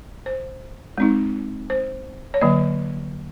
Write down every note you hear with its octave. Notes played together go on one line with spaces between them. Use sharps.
C5
G#3 C4 D#4
C5
C#5
D3 F#3 A#3 D5